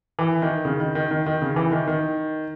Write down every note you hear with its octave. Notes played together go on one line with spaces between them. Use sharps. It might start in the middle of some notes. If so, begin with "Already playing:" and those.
E3
D#3
C#3
D#3
D#3
D#3
D#3
C#3
E3
D#3
D#3